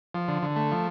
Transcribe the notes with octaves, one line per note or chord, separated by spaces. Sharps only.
F3
D3
D3
A3
F3